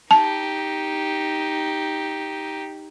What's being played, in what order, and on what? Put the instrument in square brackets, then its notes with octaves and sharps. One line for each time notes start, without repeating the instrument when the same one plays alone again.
[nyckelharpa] D#4 G4 [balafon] A5